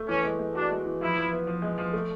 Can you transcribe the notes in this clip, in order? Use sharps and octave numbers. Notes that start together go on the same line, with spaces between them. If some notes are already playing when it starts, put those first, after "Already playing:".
Already playing: A3
E3 C#4
G#3
G#3
D4 F#4
G#3
E3
F3 E4
F3
B3
F3
G#3
F3
A3